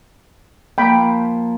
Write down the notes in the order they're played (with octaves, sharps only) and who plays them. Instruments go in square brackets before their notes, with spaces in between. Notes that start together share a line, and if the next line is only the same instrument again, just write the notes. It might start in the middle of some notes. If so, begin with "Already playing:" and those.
[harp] F3 A#3 [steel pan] G5 B5